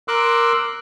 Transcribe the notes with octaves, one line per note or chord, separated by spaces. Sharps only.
A#4 C6 D6 E6 F#6